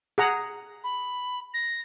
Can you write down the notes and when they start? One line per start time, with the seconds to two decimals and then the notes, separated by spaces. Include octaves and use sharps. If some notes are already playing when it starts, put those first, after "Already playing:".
0.18 G#4 F#5 A#5
0.84 B5
1.54 A#6